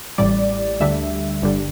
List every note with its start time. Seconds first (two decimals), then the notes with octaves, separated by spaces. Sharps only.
0.18 A1 A2 G3 D5
0.80 D2 D3 G3 E5
1.42 G1 G2 D3 G3